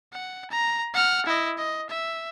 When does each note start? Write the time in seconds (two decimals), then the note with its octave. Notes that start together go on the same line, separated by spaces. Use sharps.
0.13 F#5
0.51 A#5
0.94 F#5 F6
1.26 E4 D#5
1.58 D#5
1.89 E5